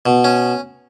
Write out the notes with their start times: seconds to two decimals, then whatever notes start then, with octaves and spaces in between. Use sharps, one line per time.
0.06 B2
0.24 C#4